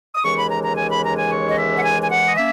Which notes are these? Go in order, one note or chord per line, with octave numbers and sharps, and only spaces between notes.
D#6
D#2 C#3 E3 G#3 C#6
B5
A#5
A#5
G#5
B5
A#5
G#5
C#5
D#5
E5
F#5
G#5
G#5
F#5
D#5
A#3 C#4 E5